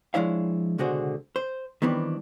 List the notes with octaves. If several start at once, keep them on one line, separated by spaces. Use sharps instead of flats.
F3 G#3 D4 E4 C#5 F5
C#2 B2 D3 F#4 G#4 C5
C5
D#3 E3 G3 B3 C4 D4